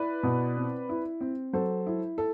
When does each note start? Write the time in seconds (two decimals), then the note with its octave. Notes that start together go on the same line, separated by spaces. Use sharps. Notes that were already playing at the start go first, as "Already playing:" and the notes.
Already playing: E4 B4 D5
0.23 B2
0.57 C4
0.89 E4
1.21 C4
1.53 F#3 A4 C5
1.87 E4
2.18 A4